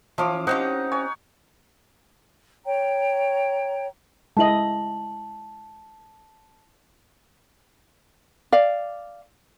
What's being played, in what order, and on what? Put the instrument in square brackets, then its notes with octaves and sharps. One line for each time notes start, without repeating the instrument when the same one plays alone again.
[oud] E3 C#4 [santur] F3 F5 D6
[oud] C4 C#4 G4 [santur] D#4 F#5
[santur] C#5 G#5
[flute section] C#5 G5 A#5
[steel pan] G#3 E4 D#5 [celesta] A5 F#7
[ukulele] D5 F5